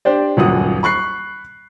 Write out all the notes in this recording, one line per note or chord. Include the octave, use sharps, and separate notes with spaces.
D4 G4 C5 D5
D#1 C#2 F#2 F#5 D#6
B5 C#6 F#6 C7